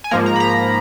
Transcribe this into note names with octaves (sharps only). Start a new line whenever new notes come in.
G#5
G#2 F3 A#3 A#5
A#5
B5
A#5